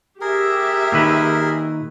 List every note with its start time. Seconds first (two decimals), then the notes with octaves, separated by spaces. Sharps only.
0.21 G4 G#4 A#4 E5
0.92 A#2 D#3 B4